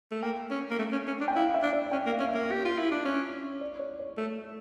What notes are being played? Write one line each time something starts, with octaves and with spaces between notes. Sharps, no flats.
A3
A#3 G5
C#4
A#3
A3
C#4
C#4
D4
G5
E4 F5
E5
D4
D5
C#4 G5
A#3
F5
C#4
E5
A#3
G4
F4
E4
D4
C#4
D5
C#5
C#5
A3